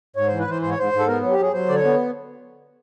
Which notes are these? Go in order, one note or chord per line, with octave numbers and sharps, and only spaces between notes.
G#2 C#5
E3 C5
B4
E3 C5
G#2 C5
C#5
G#2 C5
G#2
A4
B3 A#4
F#3
G4
F#3 G#4
F#3 C5
D3 D5
C#5
B3